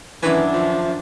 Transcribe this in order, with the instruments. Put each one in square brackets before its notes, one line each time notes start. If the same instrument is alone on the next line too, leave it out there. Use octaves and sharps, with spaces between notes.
[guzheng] F#2 D#3 G#5 [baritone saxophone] E3 [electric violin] D4 [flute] E5
[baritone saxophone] F3